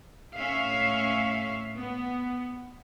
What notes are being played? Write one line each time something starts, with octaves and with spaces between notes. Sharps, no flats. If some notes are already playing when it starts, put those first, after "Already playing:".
A2 C#4 E5 F5
B3